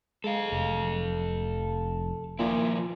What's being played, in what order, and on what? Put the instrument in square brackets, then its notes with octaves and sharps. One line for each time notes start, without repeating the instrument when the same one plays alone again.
[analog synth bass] G#3 [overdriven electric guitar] A4 F5
[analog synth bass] F1
[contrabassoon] A#2 [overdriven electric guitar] F3 E4